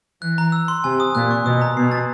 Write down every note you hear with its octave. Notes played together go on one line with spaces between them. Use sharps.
E3 F#6
A#5
E6
C6
C3 G#5
D#6
A#2 F#6
C#6
B2 D#6
A#5
B2 C7
A6